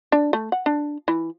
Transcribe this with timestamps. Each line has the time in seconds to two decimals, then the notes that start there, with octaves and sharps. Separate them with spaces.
0.12 D4
0.33 A3
0.52 F#5
0.66 D4
1.08 E3